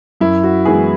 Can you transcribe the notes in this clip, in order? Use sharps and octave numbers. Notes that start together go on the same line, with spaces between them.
F#2 E4
F#4
E3 G#3 B3 G#4